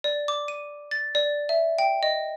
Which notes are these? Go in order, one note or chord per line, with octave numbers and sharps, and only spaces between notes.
D5
D6
D#7
A6
D5
E5
G5
D#5